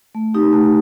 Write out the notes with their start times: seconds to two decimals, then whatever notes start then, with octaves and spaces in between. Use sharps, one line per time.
0.15 A3
0.34 C4 D#4 G4
0.53 A3